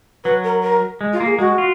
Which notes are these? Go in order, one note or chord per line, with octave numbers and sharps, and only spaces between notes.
F#3 B4
A#4
A#4
G#3
F4
A#3
G#4
G#3 F#4
F4